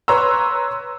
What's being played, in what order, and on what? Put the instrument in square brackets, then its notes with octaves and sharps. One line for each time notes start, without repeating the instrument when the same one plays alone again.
[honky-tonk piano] B4 C#5 A#5 C6 E6